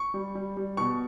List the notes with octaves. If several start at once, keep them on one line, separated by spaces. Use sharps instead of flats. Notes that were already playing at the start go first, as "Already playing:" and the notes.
Already playing: C#6
G3
G3
G3
B2 C#6